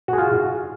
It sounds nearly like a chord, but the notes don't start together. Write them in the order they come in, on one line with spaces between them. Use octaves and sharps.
F#4 G#4 F4